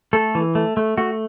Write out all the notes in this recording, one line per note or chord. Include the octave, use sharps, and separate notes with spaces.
A3 A4
E3
A3
A3
A3 F#4